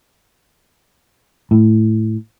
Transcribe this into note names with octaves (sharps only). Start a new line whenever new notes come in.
A2